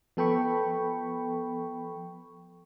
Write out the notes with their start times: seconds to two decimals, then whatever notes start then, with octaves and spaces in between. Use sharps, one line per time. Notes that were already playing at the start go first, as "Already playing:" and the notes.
0.17 F3 B3 A4 G5 B5 C#6